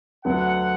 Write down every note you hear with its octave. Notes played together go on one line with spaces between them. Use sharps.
D2 D3 F#3 B3 F#5